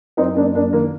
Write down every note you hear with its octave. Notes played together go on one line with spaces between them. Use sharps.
F#2 C4 D#4
F#2 A#3 D4
F#2 A#3 D4
D#3 A#3